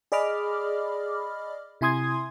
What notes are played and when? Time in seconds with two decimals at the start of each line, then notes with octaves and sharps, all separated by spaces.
0.12 G#4 D5 D#5 B5 D6 F6
1.81 C3 E4 G#5 C6 D#6 G#6